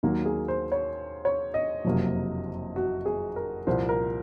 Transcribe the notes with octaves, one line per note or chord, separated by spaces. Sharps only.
D#2 D#3 F#3 A#3
G#4
C5
C#5
C#5
D#5
F#1 F2 C3 F#3 A#3
F#4
G#4
A#4
C2 A#2 F3 A#3 C5
A#4